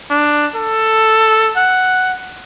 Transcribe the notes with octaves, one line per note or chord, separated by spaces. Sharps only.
D4
A4
F#5